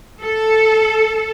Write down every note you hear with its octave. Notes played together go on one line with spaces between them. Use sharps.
A4